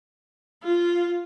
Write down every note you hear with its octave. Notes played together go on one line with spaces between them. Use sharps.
F4